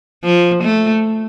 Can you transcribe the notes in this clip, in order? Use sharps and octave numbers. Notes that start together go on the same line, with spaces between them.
F3
A3